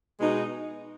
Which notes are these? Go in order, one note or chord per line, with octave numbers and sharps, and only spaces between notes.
B2 G#3 D#4